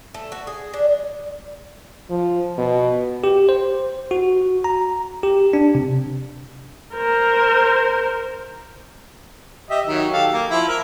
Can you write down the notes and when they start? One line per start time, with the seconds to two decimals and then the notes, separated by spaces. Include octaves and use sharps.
0.14 A3
0.32 F#4
0.47 G#4
0.73 D4
2.10 F3
2.58 B2
3.24 G4
3.49 C5
4.11 F#4
4.64 A#5
5.23 G4
5.53 D4
5.75 C3
6.94 A#4 C5
9.70 G4 D#5 E5
9.86 D#3 F#3
10.13 G4 A4 F5
10.33 A#3
10.50 F3 E4
10.68 A#4